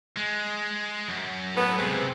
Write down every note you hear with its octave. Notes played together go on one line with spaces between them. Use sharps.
G#3
F#2
A2 B3
C#2 C3 G#3 B3 C4